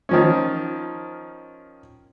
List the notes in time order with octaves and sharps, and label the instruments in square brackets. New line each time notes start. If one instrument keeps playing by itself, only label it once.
[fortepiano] D#3 F3 C#4